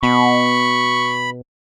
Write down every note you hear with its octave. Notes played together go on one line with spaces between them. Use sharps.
B2 B5 C#6